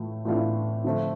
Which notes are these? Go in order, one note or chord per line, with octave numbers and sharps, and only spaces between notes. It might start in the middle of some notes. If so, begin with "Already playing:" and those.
Already playing: A2 E3 A3 F4
A2 E3 A3 D4 F4
D3 F3 A3 C4 F4